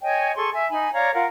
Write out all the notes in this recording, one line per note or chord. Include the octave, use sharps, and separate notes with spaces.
C#5 D#5 G5 G#5
G#4 A4 C6 C#6
E5 G#5
D#4 G#5 B5
C#5 D5 F5 A#5
F4 A#4 F5 F#5